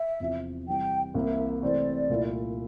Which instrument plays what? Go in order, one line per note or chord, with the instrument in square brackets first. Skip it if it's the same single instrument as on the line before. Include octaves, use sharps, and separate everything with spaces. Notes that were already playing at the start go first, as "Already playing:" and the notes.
Already playing: [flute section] E5
[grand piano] E2 C3 F3
[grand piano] C3 E3 G3 [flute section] G5
[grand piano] C2 C3 E3 A#3 [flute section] E5
[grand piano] C3 E3 A3 C4 [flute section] D5
[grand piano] C2 A#2 A3 E4